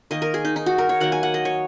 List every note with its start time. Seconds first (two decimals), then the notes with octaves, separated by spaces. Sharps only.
0.11 D#3 A#3 D#5
0.22 A#4
0.34 G#4
0.45 D#4
0.56 D#4
0.66 F#4
0.78 A#4
0.89 C#5
1.00 D#3 F#3 A#3 F#5
1.12 G#5
1.23 F#5
1.34 D#5
1.45 C#5